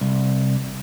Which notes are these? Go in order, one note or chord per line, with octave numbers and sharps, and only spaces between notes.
C2